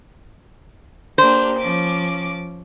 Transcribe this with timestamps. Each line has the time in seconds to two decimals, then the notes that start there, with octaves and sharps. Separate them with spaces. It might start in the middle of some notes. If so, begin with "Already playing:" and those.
1.18 A#3 D4 G4 C5
1.59 F3 C#4 D6